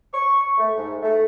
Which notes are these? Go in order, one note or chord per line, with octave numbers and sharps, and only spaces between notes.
C#6
A3
G#2
A3